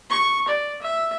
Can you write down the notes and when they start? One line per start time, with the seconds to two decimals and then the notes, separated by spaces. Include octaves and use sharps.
0.10 C#6
0.48 D5
0.82 E5